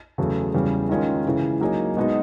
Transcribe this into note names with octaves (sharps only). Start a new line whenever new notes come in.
E2 C#3 F#3 A3
E2 C#3 E3 G3 B3
D#3 G#3 C#4 F4 A#4
C#3 E3 G#3
F#3 A#3 D#4 G#4 C#5
B2 G#3 B3 D#4 F#4